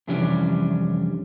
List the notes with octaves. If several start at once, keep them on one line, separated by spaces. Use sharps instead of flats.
F2 C3 E3 G3 C#4 D4